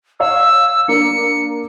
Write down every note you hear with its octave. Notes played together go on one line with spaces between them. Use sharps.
C#5 F5 E6
A#3 D4 C#7